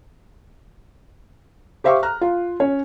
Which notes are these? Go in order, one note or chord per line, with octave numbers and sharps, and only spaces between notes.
G4 C5 E5 F5 C#6 D6
A#5 F6 F#6
F4
C#4 C#5